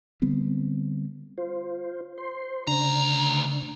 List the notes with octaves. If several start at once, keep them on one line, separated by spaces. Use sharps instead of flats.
D3 G3 B3 C4
F4 C5
C5 C6
D2 C#3 D4 A#5